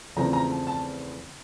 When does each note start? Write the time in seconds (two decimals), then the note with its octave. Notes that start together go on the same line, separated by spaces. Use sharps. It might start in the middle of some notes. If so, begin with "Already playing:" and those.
0.16 E2 C#3 F3 A3 C4 A#5
0.33 A#5
0.50 A5
0.67 A5